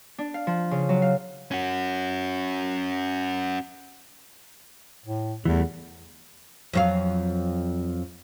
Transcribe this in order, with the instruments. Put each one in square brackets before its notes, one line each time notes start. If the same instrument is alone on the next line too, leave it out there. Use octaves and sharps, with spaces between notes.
[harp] D4
F5
F3
C#3
F#3
F5
[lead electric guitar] C#4 F#4
[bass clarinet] A2
[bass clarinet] E2 [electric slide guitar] E3 G3 A3
[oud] F2 F#3 F5